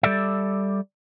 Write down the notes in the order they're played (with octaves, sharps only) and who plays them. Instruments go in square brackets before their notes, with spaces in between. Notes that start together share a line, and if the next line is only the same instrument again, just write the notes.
[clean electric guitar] G3 A4 D5 E5